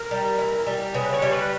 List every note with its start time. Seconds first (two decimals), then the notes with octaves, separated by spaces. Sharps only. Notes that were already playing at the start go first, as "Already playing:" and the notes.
Already playing: A#4
0.11 G3
0.38 E3
0.66 G3
0.94 C#3 B4
1.13 C#5
1.22 G3
1.32 B4